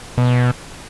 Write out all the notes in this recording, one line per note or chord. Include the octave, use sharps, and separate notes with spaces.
B2